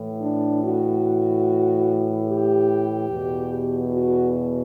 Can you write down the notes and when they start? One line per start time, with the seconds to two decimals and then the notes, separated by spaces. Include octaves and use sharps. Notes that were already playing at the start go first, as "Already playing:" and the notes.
Already playing: A2 E3
0.20 D4
0.62 F#4
2.28 G4
3.10 E2 B2
3.93 F#4